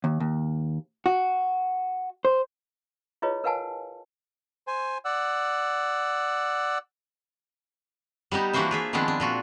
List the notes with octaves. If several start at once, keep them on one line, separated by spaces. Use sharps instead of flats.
D#2
D#2
F#4
C5
E4 F4 G#4 B4 C#5 D#5
A#4 B4 F5 F#5 G#5 A5
C5 G#5
D5 F#5 E6
G3 B3 D#4 G4
E3 A#3 D4 F#4 C5 E5
F4 G#4 E5
D#3 F3 G#3 B3 C4 D4
D4
A#2 F4 F#4